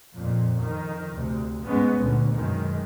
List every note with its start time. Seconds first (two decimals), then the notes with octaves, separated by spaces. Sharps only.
0.14 F2 A#2
0.60 F2 D#3
1.14 D2 C3
1.64 G#2 G#3 B3 C#4
1.99 D2 A#2 D3
2.33 F#2 B2 D#3 G#3